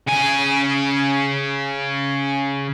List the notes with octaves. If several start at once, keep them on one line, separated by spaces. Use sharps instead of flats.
C#3 G#5